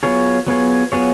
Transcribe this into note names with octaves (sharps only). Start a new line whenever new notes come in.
F#3 B3 F4 G#4 C#5
F#3 B3 F4 G#4 C#5
F#3 B3 F4 G#4 C#5